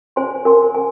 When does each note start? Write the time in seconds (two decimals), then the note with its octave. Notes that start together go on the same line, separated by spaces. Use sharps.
0.16 C5 G#5 C6
0.45 A#4 G#5 C6
0.74 G#5